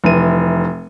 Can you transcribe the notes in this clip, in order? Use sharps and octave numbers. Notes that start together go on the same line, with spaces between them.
F1 E3 D#7